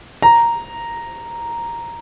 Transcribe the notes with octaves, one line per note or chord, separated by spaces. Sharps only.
A#5